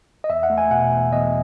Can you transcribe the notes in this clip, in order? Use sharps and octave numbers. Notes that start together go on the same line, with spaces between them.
D#5
E2 E5
F#5
A3
G#5
B2 F#5
E2
E2 D#5